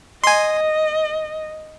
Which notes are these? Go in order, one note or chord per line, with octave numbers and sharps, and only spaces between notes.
D#5 G#5 C6